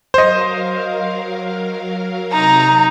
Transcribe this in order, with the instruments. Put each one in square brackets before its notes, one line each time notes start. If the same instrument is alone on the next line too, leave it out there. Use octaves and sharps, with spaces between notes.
[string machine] F#3 A#4 F5 [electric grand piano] C5 D#5
[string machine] C3 F#3 [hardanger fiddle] D#4 [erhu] A#5